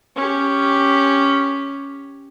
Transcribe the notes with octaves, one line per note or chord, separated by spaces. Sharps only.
C#4 G4